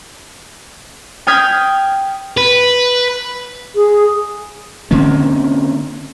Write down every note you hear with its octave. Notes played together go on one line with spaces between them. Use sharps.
G5 D#6 F6 G#6 B6
B4
G#4
D3 A#3 C4 C#4